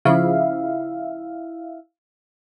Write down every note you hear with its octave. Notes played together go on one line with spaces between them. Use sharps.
C#3 F3 E4 E5 F5